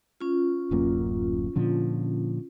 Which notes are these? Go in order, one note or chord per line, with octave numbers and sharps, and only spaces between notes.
C#4 F4
D1 F#2 A#3
A#2 D3 F3